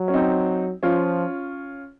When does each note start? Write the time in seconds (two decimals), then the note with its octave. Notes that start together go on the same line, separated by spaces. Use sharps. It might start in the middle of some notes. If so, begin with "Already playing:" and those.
Already playing: F#3
0.08 C#4
0.13 C4 D#4
0.83 F3 C#4 F4